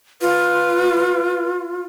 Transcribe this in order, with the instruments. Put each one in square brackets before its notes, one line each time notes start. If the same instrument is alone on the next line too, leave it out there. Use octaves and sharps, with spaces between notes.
[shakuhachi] F4 [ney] B4